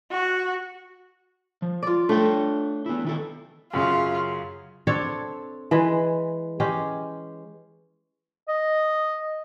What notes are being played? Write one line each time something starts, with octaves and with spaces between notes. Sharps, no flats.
F#4
F3
F4 D5
A3 D4 C#5 G5
B3 E4
D#3 E4 A4
F#2 C#3 F4 G#4
C4 D4 A4 C#5
E3 G#3 B4
G#3 C#4 G4
D#5